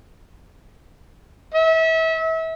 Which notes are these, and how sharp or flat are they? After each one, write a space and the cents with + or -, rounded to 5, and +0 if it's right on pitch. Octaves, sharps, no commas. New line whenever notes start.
E5 -30